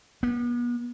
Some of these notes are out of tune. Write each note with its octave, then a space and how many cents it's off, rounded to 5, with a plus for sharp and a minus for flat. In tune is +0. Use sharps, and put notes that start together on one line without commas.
B3 -40